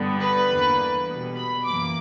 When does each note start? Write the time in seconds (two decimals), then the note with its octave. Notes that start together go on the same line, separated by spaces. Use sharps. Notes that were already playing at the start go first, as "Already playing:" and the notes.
Already playing: G2 D3 G3 B3
0.20 B4
0.50 E2 D3 A#3
1.07 B2 G3 B3
1.37 B5
1.66 F#2 E3 A#3 D6